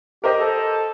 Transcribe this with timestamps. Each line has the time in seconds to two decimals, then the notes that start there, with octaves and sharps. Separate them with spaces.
0.24 G4 A#4 C5 D#5
0.40 A4